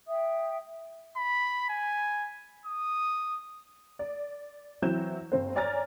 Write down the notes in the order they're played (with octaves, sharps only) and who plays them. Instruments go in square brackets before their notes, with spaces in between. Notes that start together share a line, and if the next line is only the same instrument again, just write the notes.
[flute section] E5 G5 D#6
[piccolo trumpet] B5
G#5
D#6
[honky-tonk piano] D5
E3 F#3 C4 E5 G6 E7
G1 C4 C5
C#5 D5 G#5 A#5 F6 A6